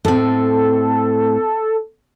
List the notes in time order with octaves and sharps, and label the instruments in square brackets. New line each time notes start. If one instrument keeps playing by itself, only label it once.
[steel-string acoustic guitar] A2 C4 [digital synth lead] A4